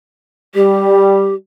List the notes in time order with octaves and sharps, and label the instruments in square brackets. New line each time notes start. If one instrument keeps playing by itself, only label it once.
[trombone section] G3 [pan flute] G4